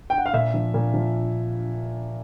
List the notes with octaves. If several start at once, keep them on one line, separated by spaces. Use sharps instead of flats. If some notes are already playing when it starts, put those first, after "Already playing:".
G5
F#5
F5
A#2 E5
F3
A#2
F3